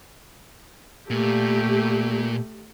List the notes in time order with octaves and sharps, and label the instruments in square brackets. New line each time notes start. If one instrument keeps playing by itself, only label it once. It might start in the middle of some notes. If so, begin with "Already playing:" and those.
[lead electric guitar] A#2 [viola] A3 G4